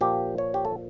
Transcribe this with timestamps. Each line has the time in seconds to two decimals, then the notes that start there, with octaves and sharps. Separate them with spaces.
0.01 A#2 F3 G4
0.38 C#5
0.54 G4
0.65 A4